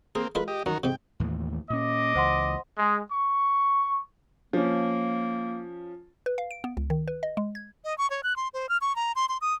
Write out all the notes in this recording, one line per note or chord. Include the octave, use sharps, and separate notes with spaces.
A#3 C4 G#4
G#3 F4 A#4 B4
G4 D#5
F#2 D#3 F#4 A#4
G#2 C3 G5
D#2 A2 E3
A#2 C#4 D#5 D6
C#2 E3 C5 F#5 C6
G#3
C#6
F3 A#3 C#4
B4
F5
D7
B3
C#2
D#3
B4
D#5
G#3
G#6
D#5
C#6
C#5
F#6
C6
C5
F6
C#6
A#5
C6
C6
D#6